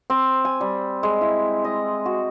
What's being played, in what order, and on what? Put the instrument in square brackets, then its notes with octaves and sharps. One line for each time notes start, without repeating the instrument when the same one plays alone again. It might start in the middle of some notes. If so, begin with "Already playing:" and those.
[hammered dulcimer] C4
G#5
G3
G#3
E4
D#5
F#4